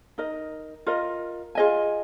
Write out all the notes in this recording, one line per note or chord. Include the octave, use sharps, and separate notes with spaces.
D#4 A#4 D#5
F4 A#4 D#5
F4 G#4 D#5 G#5